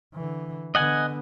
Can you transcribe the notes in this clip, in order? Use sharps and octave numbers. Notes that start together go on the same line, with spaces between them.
D3 E3
D3 B3 D#5 F#5 G#5